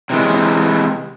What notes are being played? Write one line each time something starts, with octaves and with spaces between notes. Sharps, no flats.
C3 E3 G#3